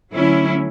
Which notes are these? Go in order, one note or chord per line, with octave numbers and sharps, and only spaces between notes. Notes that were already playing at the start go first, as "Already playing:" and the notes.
D2 D3 F#3 C#4 E4